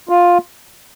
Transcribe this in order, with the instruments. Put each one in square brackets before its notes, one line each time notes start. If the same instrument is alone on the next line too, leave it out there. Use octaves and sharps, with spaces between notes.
[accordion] F4